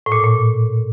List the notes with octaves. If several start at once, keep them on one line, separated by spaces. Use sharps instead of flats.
A2
A#2
A#2